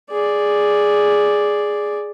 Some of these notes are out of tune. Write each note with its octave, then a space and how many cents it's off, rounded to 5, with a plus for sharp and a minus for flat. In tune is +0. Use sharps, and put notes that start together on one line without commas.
G#4 +0 D5 +0